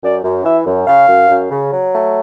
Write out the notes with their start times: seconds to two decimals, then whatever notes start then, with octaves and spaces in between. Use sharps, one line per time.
0.02 F#2 D5
0.23 F#2
0.44 E3 E5
0.66 F#2
0.86 C#3 F5
1.08 F#2
1.29 F#2
1.50 C#3
1.72 F#3
1.92 A3